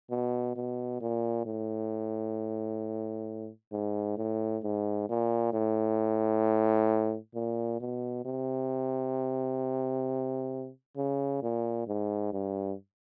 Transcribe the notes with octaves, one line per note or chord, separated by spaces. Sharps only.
B2
B2
A#2
A2
G#2
A2
G#2
A#2
A2
A#2
B2
C3
C#3
A#2
G#2
G2